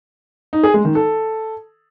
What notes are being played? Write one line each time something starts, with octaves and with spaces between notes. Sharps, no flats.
D#4
G#4
G#3
D#3
A4